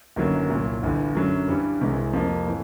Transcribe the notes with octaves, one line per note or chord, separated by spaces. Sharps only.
G1 F#2 D#3 F#3 A#3
C2 A#2 F#3
G1 G2 E3
F#2 D3 F#3
G2 E3 G3
C2 C3 E3 G#3
F2 C3 F3 A#3
A2 E3